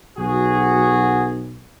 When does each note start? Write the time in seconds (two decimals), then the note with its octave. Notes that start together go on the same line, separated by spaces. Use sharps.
0.18 B1 F#4 G#4